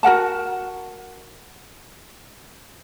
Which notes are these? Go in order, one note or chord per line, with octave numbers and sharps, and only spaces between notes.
F#4 A#4 F#5 A5